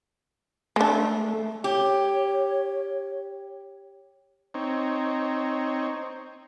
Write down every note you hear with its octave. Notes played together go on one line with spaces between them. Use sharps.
G#3 A3 D4
G4 C#5
C4 D#4 C#5